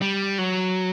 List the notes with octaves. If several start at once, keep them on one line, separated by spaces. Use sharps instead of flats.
G3
F#3